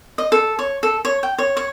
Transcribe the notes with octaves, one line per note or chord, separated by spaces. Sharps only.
D#5
A4
C#5
A4
C#5
G5
C#5
C#5